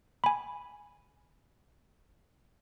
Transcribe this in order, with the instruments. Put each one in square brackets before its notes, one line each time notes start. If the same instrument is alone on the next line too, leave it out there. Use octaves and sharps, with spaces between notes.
[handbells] G#5 B5